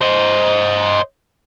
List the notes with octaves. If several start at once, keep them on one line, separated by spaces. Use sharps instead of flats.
C5 D#5